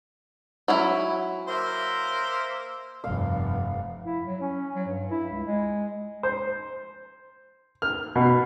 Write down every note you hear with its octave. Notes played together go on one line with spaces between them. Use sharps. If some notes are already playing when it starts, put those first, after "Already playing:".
F#3 C#4 E4
A#3 C5 E5
F1 G2 F5
E4
F#3
C#4
F#3
G2
E4
C#2
G#3
C5
F6
B2